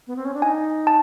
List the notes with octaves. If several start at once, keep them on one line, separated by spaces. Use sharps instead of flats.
B3
C4
C#4
D4
D#4 G#5
A5